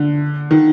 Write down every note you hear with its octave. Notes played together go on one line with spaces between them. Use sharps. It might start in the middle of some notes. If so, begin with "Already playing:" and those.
Already playing: D3
D#3